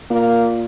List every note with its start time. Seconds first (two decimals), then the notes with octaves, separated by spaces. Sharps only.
0.10 A#2 A#3